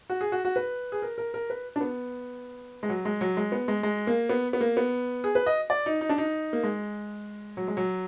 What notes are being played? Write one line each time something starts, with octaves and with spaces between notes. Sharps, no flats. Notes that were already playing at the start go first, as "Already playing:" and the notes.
F#4
G#4
F#4
F#4
B4
G#4
A#4
A#4
A#4
B4
D4
B3
G#3
F#3
G#3
F#3
G#3
B3
G#3
G#3
A#3
B3
B3
A#3
B3
G#4
B4
D#5
D5
D#4
D#4
D4
D#4
A#3
G#3
F#3
G#3
F#3